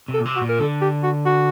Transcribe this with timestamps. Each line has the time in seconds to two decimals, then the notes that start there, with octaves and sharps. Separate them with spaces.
0.08 C3
0.14 A4
0.20 A#2
0.25 C3
0.36 F#4
0.42 A#2
0.49 A#4
0.59 D3 A4
0.81 G4
1.03 F#4
1.26 F#4